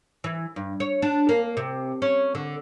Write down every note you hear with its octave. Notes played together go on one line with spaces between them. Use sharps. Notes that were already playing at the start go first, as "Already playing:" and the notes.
E3
G2
C#5
D4
A#3
C3
C#4
D3